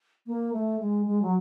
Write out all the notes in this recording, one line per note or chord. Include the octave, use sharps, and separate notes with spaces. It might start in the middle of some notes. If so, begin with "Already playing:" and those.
A#3
A3
G#3
G#3
F#3